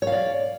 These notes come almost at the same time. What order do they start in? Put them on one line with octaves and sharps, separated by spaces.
C#5 F5 D5